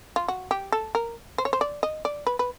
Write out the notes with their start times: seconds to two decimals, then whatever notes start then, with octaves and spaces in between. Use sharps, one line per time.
0.16 F4
0.28 F#4
0.51 G4
0.72 A4
0.95 A#4
1.38 C5
1.45 C#5
1.53 C5
1.61 D5
1.83 D#5
2.05 D5
2.27 B4
2.39 B4